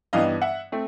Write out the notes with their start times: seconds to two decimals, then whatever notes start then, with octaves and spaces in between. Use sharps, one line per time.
0.13 G2 E3 G3 B3 D#4 D#5 F5
0.42 E5 F#5
0.72 A3 C4